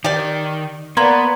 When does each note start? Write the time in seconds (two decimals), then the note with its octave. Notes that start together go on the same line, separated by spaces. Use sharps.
0.04 D#3 G4 D5
0.97 A#3 B3 B4 D5 F#5 A#5 C6 G#6